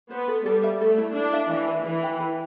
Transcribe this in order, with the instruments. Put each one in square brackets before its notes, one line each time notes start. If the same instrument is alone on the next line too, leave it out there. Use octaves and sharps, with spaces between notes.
[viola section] B3 [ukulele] C5
[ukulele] A4
[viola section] G3 [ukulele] A4
[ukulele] E5
[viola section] A3 [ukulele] A4
[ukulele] E4
[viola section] D4 [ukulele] E4
[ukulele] E5
[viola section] E3 [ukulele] E5
[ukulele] B4
[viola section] E3 [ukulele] B4
[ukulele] G5
B4